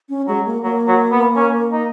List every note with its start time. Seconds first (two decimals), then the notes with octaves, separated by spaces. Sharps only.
0.09 C#4
0.28 F#3 G#3
0.45 A#3
0.63 F#3 A#3
0.88 F#3
1.12 B3
1.36 C#4
1.72 D#4